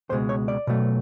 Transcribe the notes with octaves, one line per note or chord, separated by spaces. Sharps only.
C#2 B2 G#3 C5
C#5
D5
B2 F#3 A3